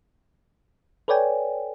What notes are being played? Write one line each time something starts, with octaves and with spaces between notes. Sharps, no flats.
A4 B4 C#5 D5 G5 G#5